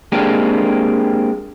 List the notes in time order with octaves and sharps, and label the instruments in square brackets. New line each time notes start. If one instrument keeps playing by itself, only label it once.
[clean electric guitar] G#3 A#3 C4 D4 G4